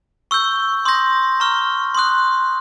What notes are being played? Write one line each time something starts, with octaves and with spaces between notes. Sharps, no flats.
C#6 E6 G6
C6 D#6 G6 A#6
A#5 C#6 F6
C6 D#6 F#6